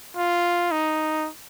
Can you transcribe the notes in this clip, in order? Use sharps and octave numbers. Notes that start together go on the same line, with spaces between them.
F4
D#4